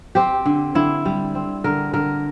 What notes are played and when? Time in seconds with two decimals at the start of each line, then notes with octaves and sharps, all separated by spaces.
0.15 C4 G4
0.46 D3
0.75 D3 E4
1.05 G3
1.35 C4
1.64 D3 A#4
1.94 D3 A#4